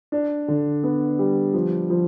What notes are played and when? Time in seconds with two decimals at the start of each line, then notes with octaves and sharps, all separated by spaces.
0.12 D4
0.48 D3
0.84 B3
1.19 G3
1.54 F3
1.90 F3